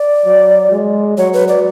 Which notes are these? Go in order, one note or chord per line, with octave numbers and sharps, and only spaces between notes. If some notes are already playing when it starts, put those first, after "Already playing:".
Already playing: D5
F#3
G#3
F#3 C#5
B4
D5